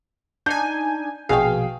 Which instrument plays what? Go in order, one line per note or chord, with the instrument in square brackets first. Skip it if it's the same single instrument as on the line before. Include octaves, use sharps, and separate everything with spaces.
[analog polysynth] D4 D#4 G#5 [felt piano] G6
[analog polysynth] A#1 B2 F5 [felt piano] G#4 G5